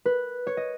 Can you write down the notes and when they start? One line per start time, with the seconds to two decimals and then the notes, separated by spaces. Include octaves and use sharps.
0.05 B4
0.47 C#5
0.57 D#5